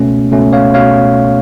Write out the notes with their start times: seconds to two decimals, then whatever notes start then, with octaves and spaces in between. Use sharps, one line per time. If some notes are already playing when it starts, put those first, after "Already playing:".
Already playing: C#2 B2 A3 C#4
0.32 C#2 B2 A3 C#4
0.53 C#5 F5
0.74 B2 C#5 F5